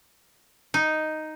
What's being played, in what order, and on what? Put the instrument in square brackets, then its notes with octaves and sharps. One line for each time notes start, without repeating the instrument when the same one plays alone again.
[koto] D#4